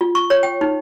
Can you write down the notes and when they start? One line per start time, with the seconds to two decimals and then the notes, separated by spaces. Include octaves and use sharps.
0.01 F4
0.15 C#6
0.30 C#5
0.43 G5
0.61 D#4